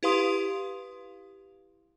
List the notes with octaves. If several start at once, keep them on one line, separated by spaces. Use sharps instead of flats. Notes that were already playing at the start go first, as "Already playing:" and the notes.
E4 G4 B4 F5 C6 D#6